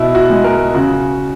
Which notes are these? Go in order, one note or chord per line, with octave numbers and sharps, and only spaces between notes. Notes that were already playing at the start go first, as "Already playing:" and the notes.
Already playing: B2 E4
F#4
G#3
A#4
C#3 F#4